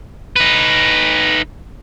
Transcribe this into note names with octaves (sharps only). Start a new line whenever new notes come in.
D#4 B4